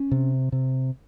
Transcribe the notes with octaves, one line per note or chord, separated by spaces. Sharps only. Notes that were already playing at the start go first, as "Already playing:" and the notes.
Already playing: C#4
C3
C3